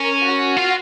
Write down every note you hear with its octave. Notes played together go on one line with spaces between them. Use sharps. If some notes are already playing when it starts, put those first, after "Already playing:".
Already playing: C#4 A#4
F#4
F4